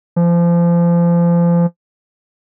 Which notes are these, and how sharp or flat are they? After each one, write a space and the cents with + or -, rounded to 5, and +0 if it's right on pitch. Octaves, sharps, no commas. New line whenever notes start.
F3 -30